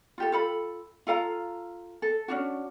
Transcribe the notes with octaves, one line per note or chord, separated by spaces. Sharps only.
F4 G4 A4
F4 A4 B5
F4 A4 F5 A#5
A4
C#4 D4 F#4